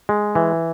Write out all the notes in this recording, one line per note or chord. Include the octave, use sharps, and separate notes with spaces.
G#3
E3